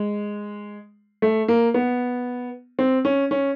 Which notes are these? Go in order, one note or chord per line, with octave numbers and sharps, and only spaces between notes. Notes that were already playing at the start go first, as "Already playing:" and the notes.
Already playing: G#3
A3
A#3
B3
C4
C#4
C#4